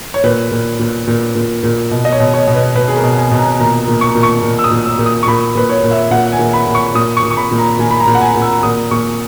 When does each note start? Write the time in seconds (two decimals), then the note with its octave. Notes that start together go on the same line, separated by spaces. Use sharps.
0.14 C#5
0.24 A#2 B4
0.52 A#2
0.79 A#2
1.07 A#2
1.35 A#2
1.63 A#2
1.91 B2
2.05 D#5
2.12 C#5
2.20 B2
2.34 C#5
2.47 B2
2.55 B4
2.75 B2 B4
2.88 G#4
2.97 A#4
3.03 B2
3.17 G#5
3.31 B2
3.38 A#5
3.60 A#2 A#5
3.88 A#2
4.01 C#6
4.15 A#2
4.23 C#6
4.43 A#2
4.59 E6
4.64 D#6
4.71 A#2
4.85 E6
4.99 A#2
5.06 D#6
5.23 C#6
5.27 A#2 B5
5.55 A#2 B4
5.69 C#5
5.83 A#2
5.91 E5
6.11 A#2 F#5
6.32 G#5
6.39 A#2
6.53 B5
6.67 A#2
6.75 C#6
6.95 A#2 D#6
7.17 C#6
7.23 A#2
7.31 C#6
7.37 B5
7.51 A#2
7.58 A#5
7.79 A#2 G#5
7.91 B5
8.00 A#5
8.07 A#2
8.15 F#5
8.21 G#5
8.35 A#2
8.42 E6
8.63 A#2 D#6
8.91 A#2 C#6